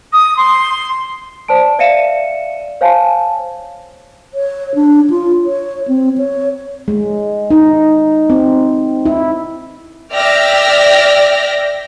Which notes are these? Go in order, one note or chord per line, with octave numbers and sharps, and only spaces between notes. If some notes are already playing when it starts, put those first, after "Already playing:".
D#6
C6
C5 D5 A5 D7
D5 E5 F5 C#7 D#7 E7
C5 C#5 F5 G#5 A5
C#5
D4
F4
C#5
C4
C#5
G#3
D#4
C4
E4
D5 E5 G5 F6 A#6